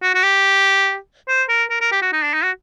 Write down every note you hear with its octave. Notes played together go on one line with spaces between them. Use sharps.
F#4
F#4
G4
C5
A#4
A#4
A#4
G4
F#4
D#4
D4
D#4
F#4